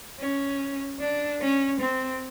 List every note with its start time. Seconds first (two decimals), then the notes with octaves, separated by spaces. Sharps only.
0.20 C#4
1.00 D4
1.41 C#4
1.80 C4